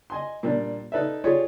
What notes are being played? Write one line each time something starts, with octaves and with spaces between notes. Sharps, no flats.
D#5 G#5 C6
A#2 G3 D4
D#4 A4 B4 D5 E5
F4 G4 G#4 C#5 D5